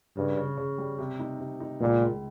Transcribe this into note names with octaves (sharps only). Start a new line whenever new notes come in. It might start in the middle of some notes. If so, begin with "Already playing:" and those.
G2 C#3
C#3
C#3
G3
C3
D#4
C3
D#4
C#2 A#2
G#3